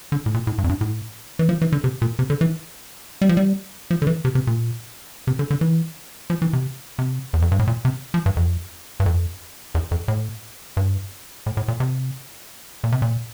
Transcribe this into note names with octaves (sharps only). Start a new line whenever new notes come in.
D3
A2
A#2
A2
G2
F2
G2
A2
E3
F3
E3
D3
C3
A#2
C3
D3
E3
G3
F3
G3
F3
D3
E3
C3
C3
A#2
C3
D3
D3
E3
F3
E3
C3
C3
E2
F2
G2
A2
A#2
C3
F3
G2
F2
G2
F2
E2
F2
A2
G2
A2
A2
A#2
C3
A#2
C3
A#2